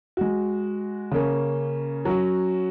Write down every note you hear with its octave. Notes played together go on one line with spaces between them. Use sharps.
G#3 F#4
C#3 A#3 C#4
F#3 C#4 F#4